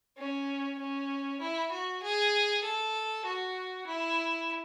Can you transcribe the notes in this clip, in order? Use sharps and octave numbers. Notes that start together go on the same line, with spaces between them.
C#4
C#4
E4
F#4
G#4
A4
F#4
E4